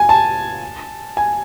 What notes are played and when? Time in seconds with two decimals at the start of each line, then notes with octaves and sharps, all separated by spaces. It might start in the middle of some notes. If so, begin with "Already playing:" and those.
Already playing: G#5
0.09 A5
1.17 G#5